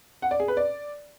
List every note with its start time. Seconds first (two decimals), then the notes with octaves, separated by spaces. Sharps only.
0.22 F#5
0.31 D5
0.40 G#4
0.48 B4
0.57 D5